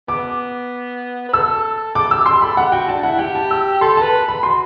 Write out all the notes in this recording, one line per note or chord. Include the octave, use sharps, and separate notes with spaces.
B3 D6
B4
A4 E6
A4 D6
G4 E6
G4 C6
A4 B5
G4 F#5
F#4 G5
D4 A5
E4 F#5
G4 G5
A5
E6
A4 C6
B4 A5
B5
F#4 C6